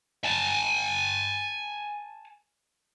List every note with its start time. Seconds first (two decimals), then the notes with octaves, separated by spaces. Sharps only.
0.24 G#5 A5